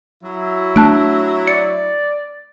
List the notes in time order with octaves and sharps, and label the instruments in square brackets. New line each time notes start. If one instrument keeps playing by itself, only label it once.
[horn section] F#3 E4
[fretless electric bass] A3 D4 [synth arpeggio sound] A5 F#6 D7
[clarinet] D5 [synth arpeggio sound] C#7